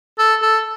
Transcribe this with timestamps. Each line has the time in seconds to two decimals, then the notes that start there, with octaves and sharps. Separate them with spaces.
0.19 A4
0.42 A4